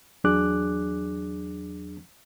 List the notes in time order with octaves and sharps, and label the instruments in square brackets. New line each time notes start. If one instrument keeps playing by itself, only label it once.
[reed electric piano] E2 F#3 D4 G#4 D6 F#6